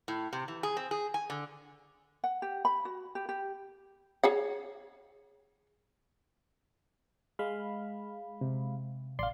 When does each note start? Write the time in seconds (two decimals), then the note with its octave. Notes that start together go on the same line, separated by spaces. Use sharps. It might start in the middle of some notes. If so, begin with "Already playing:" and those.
0.08 A2
0.33 C3
0.48 E3
0.63 G#4
0.77 C4
0.91 G#4
1.14 G#5
1.30 D3
2.24 F#5
2.42 G4
2.65 B5
2.85 F#4
3.15 G4
3.29 G4
4.24 G#4 C#5 F#5
7.39 G#3 F5 B5
8.41 C3
9.19 A1 D5 F5 C6